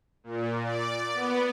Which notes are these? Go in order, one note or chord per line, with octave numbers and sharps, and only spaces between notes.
A#2
D5
B3